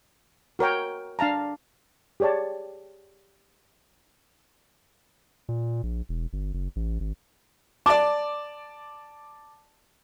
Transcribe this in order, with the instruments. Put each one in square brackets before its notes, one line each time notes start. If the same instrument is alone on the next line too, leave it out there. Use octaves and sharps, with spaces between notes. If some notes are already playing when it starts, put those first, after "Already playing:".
[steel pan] F#4 A#4 C#5 G5
D4 F5 A5 A#5
G4 G#4 C#5 D5 A5
[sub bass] A#2
A#1
E1
G1
F#1
A1
G#1
[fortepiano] D5 A5 [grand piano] D6